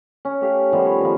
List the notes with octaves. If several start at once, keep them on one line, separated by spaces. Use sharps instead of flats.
C#4
A3 G4 F5
D#3 F3 G3 B3
C#5
D#3 F3